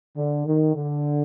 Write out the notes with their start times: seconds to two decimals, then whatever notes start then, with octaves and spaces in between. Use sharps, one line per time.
0.17 D3
0.46 D#3
0.75 D3